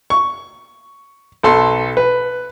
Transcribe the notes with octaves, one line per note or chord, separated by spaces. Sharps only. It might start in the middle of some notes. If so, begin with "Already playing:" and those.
C#6
B1 A4 C6
B4